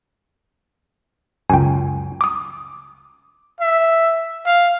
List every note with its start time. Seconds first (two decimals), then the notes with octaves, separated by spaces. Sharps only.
1.50 C#2 F#2 G5 G#5
2.21 D6 D#6
3.61 E5
4.46 F5